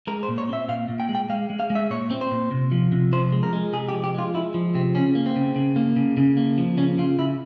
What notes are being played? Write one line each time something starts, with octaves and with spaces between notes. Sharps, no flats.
G#3 A#4
C5
A#2
C#5
C4 E5
A#2 F5
A#2
G5
G#3
G5
G#3 F5
G#3
F5
G#3
E5
A#2 C#5
C4
C5
A#2
C3
F3
C3
F3 C5
G#3
A#4
G#3
C3 G#4
G4
F3
G4
G#3 F4
G#3 E4
F3
C3 C4
C#3 C#4
A#3
C4
C#3
C#3
A#3
C#3
C#3
A#3
F3
C#3 C#4
C#3 F4
C#3 E4